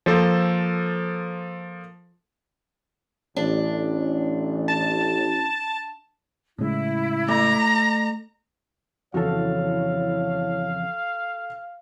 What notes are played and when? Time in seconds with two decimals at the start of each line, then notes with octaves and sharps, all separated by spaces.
0.06 F3 A#3 A4 C5
3.36 A1 D4
4.68 A5
6.59 A2 C#3 G#3 E4
7.29 A3 A#5
9.14 F2 C#3 E3 E4 F#4 A4 C#5 F5